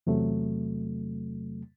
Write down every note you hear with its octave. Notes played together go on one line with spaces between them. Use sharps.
E2 C3 F#3 A3